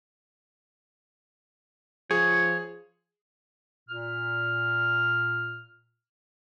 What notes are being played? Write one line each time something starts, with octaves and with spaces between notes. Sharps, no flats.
F3 G#4 C#5
A#2 F6